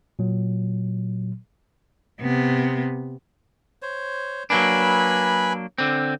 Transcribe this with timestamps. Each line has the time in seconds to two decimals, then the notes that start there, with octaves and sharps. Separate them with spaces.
0.19 A#2 F#3
2.21 C3 B3
3.82 C5 C#5
4.50 F#3 A#3 D4 B4 G#5 B5
5.78 D3 C4